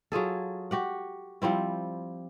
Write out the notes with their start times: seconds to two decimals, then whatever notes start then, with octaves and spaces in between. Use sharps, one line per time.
0.12 F#3 F4 G#4 A4
0.71 F#4 G4 F#5
1.42 F3 G3 C4 E4